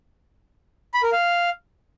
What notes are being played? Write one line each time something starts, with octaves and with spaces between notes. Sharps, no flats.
B5
A#4
F5